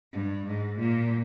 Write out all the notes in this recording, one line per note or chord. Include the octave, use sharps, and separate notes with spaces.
G2
G#2
A#2